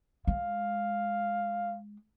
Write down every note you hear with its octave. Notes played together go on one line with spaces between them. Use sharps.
G#3 F5